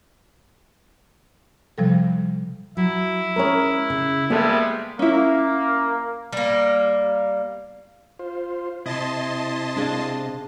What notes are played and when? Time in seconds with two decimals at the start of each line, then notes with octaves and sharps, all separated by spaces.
1.78 C3 F3 G3 A4
2.77 F#3 E4
3.36 G#3 C#4 G#4 A#4 C#5
3.90 C#3
4.30 G3 G#3 A#3 B3 G#4 A4 E5
4.99 A#3 C#4 E4
6.33 G3 A#3
8.19 F4 C5
8.86 C3 E4 D#5 A5 C6
9.76 D4 G#4 F5